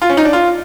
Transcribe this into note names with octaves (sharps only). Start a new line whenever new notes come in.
F4
C#4
D#4
D4
F4